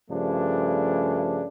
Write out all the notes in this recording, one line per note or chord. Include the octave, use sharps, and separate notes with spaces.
G2 C#3 F3 A3 D4